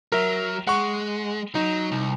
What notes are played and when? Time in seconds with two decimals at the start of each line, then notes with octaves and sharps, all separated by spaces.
0.12 F#3 A#4 E5
0.67 G#3 F#5 C#6
1.55 F#3 D#4
1.92 C2